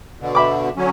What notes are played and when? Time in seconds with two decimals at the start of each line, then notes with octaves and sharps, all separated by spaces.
0.20 B2 D3
0.35 E5 B5 D6
0.77 D3 F#3 C#4